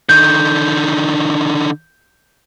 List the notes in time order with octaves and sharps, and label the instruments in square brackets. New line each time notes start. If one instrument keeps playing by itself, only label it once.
[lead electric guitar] D3 D#3 [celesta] G6